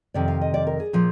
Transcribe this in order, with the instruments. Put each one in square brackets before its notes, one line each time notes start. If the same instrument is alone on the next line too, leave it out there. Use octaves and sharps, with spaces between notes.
[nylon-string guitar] F2 C3 D#3 D5
F5
D#5
D5
A#4
G#4
A#2 F3